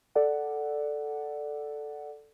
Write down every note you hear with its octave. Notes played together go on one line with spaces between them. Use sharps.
A4 D5 F#5